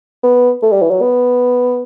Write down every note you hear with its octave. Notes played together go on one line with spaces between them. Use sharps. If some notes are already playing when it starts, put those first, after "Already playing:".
B3
A3
G3
E3
F#3
B3